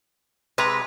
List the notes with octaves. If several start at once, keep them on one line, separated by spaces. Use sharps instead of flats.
C3 G#3 B4 A#5